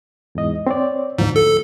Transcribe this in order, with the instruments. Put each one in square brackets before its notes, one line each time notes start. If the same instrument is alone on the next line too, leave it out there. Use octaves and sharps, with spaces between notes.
[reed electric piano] E2 G#2 D#5
C4 C#5 D5
[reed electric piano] D2 F3 [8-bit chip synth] G#2
[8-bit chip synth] A4